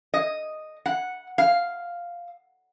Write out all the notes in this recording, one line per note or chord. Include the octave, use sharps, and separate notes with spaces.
D#5
F#5
F5